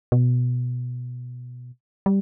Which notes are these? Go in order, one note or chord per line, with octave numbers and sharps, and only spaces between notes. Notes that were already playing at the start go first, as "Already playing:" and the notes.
B2
G3